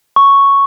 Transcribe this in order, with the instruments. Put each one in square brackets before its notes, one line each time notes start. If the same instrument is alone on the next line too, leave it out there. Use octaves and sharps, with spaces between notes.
[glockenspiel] C#6